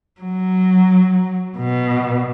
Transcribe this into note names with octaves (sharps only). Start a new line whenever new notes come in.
F#3
B2